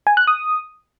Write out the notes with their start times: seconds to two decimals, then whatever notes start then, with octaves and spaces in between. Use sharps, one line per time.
0.07 G#5
0.17 F#6
0.27 D#6